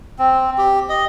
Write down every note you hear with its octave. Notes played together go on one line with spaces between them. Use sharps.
C4
G4
D#5